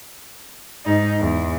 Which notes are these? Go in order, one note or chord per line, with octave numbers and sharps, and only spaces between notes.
G#2 D#4
E2